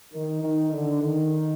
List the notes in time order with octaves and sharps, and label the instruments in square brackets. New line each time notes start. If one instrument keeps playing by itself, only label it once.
[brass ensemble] D#3
D#3
D3
D#3